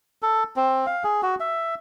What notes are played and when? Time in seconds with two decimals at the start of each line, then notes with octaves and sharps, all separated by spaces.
0.22 A4
0.56 C4
0.86 F5
1.04 G#4
1.23 F#4
1.40 E5